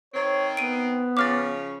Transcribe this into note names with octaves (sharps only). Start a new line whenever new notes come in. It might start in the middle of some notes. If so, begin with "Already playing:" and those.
D#3 C4 C#5
B3 D7 D#7
C#3 F3 C#4 D6 F6 A6